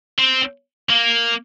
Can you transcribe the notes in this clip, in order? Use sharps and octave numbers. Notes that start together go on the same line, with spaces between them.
C4
A#3